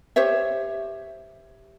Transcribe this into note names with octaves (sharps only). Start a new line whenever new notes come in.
G4 C5 C#5 E5